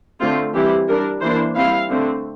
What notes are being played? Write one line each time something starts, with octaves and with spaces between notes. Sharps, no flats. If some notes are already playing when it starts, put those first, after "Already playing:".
D3 A3 C4 F4
E3 G3 C4 E4 G4
G3 D4 A#4
E3 A#3 D4 C5
G3 C4 E4 F5
D3 A3 C4